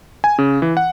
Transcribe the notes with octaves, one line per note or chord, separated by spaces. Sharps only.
G#5
C#3
E3
F#5